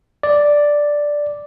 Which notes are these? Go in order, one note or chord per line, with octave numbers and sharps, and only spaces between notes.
D5